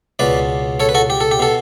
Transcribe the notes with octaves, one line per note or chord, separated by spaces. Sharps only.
C#2 B2 B4 D5
A4 C#5
B4
F#4 A4
G4
A4
G4
B2 A4